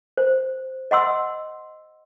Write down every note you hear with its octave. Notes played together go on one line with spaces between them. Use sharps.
C5
D#5 F#5 C6 E6